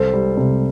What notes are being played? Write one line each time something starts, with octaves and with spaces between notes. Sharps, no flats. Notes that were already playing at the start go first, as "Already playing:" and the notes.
Already playing: C2 A4 C5
G3
C3